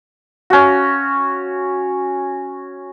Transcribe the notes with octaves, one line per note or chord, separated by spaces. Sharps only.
C#4 F#4